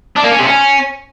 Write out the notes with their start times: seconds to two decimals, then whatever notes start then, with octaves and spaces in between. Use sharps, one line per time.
0.16 D4
0.24 A#3
0.32 C#4
0.39 C3
0.47 C#4